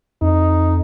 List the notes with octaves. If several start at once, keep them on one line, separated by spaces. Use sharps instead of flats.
F2 D#4